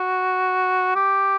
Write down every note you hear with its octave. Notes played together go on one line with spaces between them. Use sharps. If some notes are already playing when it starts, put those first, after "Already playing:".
Already playing: F#4
G4